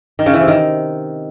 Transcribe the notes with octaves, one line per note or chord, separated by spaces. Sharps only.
D#3
C#3
E3
C3
D#3